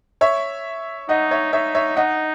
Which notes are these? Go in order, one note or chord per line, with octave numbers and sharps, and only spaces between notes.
C#5 E5
D#4 D#5 F#5
C#5 E5
D#4 C#5 E5
C#5 E5
D#4 D#5 F#5